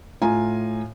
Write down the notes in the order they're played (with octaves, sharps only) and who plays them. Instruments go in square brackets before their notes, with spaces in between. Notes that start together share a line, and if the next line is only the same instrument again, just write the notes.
[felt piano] A2 F4 G#5 A#5